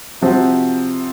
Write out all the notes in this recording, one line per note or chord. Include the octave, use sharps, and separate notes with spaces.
C3 F3 C4 F#4 C5